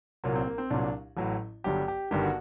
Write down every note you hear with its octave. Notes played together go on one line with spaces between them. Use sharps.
C2 A#2 F#3 A#3
C4
A#3
C4
C2 A#2 F#3 D4
A1 A2 F#3
G1 G2 F#3 G4
G4
G1 G2 D#3 G4
F#4